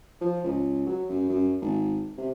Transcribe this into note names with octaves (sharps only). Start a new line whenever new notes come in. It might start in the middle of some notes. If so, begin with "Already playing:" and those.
F3
C#2
F#3
F#2
F#2
G#1
C3